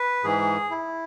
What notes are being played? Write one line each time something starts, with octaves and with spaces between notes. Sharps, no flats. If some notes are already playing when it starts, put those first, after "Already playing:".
Already playing: B4
G#2 E3 G#4
E4